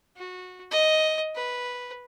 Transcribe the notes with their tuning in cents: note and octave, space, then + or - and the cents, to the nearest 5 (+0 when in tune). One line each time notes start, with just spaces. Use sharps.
F#4 -20
D#5 +5
B4 -5